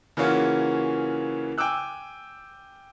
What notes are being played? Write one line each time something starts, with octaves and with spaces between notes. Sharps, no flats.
C#3 E3 A#3 C#4 F4 F#4
G5 G#5 D6 E6 F#6